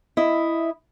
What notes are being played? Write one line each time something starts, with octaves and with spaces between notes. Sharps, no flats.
E4 D#5